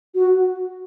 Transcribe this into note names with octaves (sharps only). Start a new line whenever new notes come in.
F#4